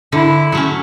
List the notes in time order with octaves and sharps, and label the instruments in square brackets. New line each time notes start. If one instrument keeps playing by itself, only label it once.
[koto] D3 [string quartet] E4
[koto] F#3 A3 C#4